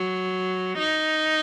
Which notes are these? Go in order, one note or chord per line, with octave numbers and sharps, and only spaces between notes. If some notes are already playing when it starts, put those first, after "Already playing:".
Already playing: F#3
D#4